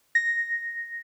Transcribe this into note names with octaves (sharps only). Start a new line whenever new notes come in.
A#6